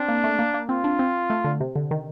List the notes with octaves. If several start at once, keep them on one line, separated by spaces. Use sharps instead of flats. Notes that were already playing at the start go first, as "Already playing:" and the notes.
Already playing: C4 D4
A#3
A3
A#3
A#3
C4 F4
D4
C4
A3
D3
C3
D3
D#3